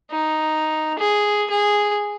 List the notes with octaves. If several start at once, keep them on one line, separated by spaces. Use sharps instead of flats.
D#4
G#4
G#4